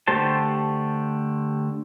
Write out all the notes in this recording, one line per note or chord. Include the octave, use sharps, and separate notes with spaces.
D3 A3 G4 C5 A5